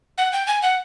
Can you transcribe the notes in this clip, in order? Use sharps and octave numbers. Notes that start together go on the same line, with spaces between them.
F#5
G5
G#5
F#5